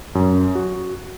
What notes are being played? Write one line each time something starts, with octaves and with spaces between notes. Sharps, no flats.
F#2
F#4